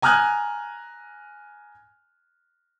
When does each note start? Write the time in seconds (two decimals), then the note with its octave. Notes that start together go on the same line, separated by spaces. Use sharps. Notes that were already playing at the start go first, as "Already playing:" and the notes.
0.02 G#5 A#5 D#6 F6 F#6 G#6